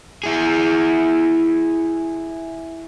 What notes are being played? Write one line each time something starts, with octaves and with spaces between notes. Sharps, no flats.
E4 G#4